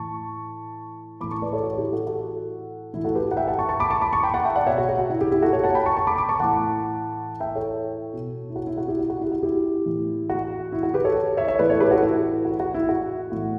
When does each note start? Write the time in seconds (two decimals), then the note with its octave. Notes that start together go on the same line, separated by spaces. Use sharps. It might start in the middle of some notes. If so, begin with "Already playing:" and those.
Already playing: A2 E3 A5 C#6
1.21 A2 E3 B5 D6
1.31 A5 C#6
1.42 B4 D5
1.53 A4 C#5
1.63 F#4
1.78 E4 G4
1.93 F#4 A4
2.07 F#4 A4
2.93 A2 E3 E4
3.04 F#4 A4
3.15 G4 B4
3.31 F#5
3.37 E5 G5
3.48 F#5 A5
3.59 A5 C#6
3.69 A5 C#6
3.80 B5 D6
3.90 A5 C#6
4.01 B5 D6
4.13 A5 C#6
4.23 G5 B5
4.34 F#5 A5
4.45 E5 G5
4.56 D5 F#5
4.66 B2 C#5 E5
4.78 F#4
4.89 F#4
4.99 F#4
5.10 E4
5.21 E4 G4
5.31 E4 G4
5.42 F#4 A4
5.53 A4 C#5
5.64 F#5 A5
5.75 G5 B5
5.86 A5 C#6
5.96 A5 C#6
6.07 B5 D6
6.18 B5 D6
6.29 A5 C#6
6.39 A2 E3 F#5 A5
7.40 E5 G5
7.55 A4 C#5
8.13 B2
8.50 E4
8.56 F#4
8.67 E4
8.78 F#4
8.88 E4 G4
8.99 F#4
9.10 F#4
9.21 E4
9.27 G4
9.32 F#4
9.43 E4 G4
9.86 A2 E3
10.30 F#4
10.72 E4
10.83 F#4
10.94 G4 B4
11.05 A4 C#5
11.37 C#5 E5
11.48 C#5 E5
11.59 A2 E3 B4 D5
11.70 A4 C#5
11.80 G4 B4
11.91 F#4 A4
12.03 E4
12.45 F#4
12.60 F#4
12.74 E4
12.89 F#4
13.32 A2 E3